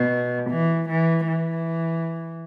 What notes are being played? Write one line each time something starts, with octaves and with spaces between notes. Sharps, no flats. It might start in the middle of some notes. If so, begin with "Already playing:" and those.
Already playing: B2
E3
E3
E3